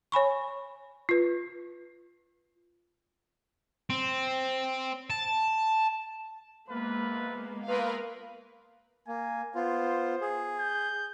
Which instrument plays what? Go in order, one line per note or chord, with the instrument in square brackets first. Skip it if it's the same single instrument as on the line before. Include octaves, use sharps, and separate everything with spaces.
[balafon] C#5 G#5 B5 C#6
F4 B4
[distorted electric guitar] C4
A5
[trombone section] C3 F4 B4 [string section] G#3 A#3 B3
[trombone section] E2 F4 [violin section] A#4 B4 F5
[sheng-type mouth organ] A#3 [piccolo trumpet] G#5
[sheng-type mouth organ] B3 F4 [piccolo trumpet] C5
[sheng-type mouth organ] G#4
[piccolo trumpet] G6